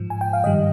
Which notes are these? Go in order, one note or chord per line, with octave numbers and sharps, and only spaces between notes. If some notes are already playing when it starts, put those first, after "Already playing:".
Already playing: G#2 F3
G#5
G5
F5
G2 D#3 G3 D#5